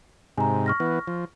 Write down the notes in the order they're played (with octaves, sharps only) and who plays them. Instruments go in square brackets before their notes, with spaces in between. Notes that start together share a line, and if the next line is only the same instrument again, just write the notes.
[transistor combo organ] G#2 C3 [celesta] G#5 A#5
[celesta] C#6 F6 A#6
[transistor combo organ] E3 B3
F3